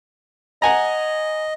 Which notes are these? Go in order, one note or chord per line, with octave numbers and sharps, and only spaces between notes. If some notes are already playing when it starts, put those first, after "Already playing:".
D#5 F#5 G#5 A#5